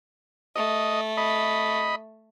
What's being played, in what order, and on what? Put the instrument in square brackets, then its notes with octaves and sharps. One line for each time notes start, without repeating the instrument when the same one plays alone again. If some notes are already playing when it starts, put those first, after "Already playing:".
[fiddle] A3 [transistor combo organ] D#5
[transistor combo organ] D#5 B5